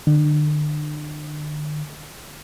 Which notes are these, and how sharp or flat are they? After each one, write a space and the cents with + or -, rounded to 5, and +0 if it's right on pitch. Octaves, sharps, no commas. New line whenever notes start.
D3 +35